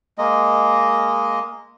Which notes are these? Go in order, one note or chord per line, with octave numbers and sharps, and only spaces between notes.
G#3 A#3 D#5